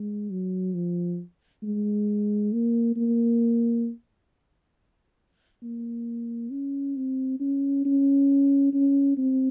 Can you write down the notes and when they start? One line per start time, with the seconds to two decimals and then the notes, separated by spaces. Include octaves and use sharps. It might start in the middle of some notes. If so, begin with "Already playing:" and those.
Already playing: G#3
0.31 F#3
0.74 F3
1.63 G#3
2.53 A#3
2.97 A#3
5.63 A#3
6.52 C#4
6.97 C4
7.40 C#4
7.85 C#4
8.73 C#4
9.18 C4